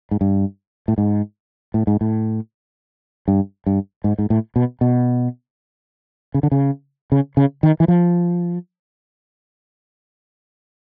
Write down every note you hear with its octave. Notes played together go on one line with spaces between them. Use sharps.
G#2
G2
A2
G#2
A2
G#2
A2
G2
G2
G#2
G#2
A2
B2
B2
C#3
D3
C#3
C#3
C#3
D#3
E3
F3